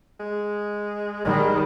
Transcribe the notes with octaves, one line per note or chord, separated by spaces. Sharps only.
G#3
D#3 G3 G#3